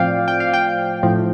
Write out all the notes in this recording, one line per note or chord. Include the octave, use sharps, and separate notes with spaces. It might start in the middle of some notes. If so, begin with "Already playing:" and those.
Already playing: A2 F3 C4 D5 F5 G5
G5
F5
G5
A2 F3 C4